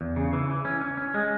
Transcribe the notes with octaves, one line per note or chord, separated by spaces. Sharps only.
E2
C#3
E3
E3
C#4
C#4
C#4
G#3